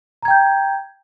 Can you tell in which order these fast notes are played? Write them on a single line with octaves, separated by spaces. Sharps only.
A#5 G#6 G5 G6